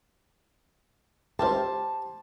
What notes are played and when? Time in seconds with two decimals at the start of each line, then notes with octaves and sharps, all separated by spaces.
1.39 C#2 E4 G4 A#4 C5 A5 C6